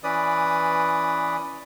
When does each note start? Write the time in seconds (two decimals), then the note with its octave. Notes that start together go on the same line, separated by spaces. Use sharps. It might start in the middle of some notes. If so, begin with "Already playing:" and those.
0.03 E3 C#4 B4 D5 D#6